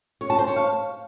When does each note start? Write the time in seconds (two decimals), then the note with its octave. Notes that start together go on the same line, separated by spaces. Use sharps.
0.21 C#5
0.30 A5
0.39 C5
0.47 C#5
0.56 F5